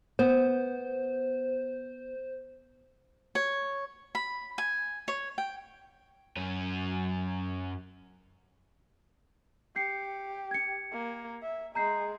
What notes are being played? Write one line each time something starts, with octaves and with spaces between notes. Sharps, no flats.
B3 C5
C#5
B5
G#5
C#5
G5
F#2 C#4
G4 G6 C7 C#7
G#6 C#7
A#3
E5
G#3 A#5 G6 C7